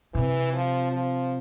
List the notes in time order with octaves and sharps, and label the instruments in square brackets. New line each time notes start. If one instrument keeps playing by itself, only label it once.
[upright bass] C3 [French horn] E3
[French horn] F3
F3